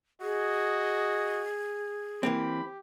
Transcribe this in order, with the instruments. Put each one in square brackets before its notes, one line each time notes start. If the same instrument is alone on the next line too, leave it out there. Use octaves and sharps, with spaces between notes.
[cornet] F#4 [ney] G#4 [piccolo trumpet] D#5
[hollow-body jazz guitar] E3 A#3 C4 [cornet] G4 [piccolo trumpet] B5